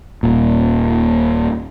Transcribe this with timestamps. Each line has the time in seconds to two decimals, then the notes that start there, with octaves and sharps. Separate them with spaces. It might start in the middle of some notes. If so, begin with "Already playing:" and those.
0.23 D#1 A#2